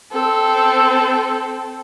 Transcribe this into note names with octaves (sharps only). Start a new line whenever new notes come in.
C4 A4